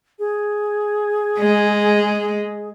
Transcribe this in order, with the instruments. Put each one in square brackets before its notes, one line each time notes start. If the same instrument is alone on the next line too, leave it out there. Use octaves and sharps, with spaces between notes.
[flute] G#4
[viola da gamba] G#3